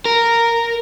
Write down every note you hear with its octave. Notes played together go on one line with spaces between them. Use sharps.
A#4